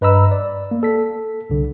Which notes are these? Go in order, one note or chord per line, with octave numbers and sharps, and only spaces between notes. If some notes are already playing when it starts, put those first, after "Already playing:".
G2 B4 D#5 A#5 B5 E6
D5
A#3
A4 B6
C2 D3